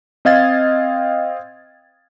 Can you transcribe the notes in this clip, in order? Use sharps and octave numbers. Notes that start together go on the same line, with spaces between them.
C4 D#5 F5 G#6 A6